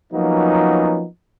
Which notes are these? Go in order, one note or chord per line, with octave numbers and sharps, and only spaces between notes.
F3 F#3 A#3 B3 C#4 D#4